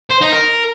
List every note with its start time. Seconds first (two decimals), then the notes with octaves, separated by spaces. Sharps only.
0.10 C5
0.21 D#4
0.32 A#4